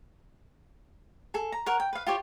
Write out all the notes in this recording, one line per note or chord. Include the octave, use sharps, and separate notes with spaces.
G#4 A4
A#5
A#4 C#5 F#5
G5
B4 F5
F4 G4 C#5